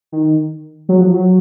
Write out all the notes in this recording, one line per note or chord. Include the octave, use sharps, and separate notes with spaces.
D#3
F#3
F3
F#3